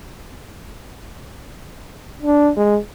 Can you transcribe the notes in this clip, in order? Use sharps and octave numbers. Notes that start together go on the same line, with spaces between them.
D4
G#3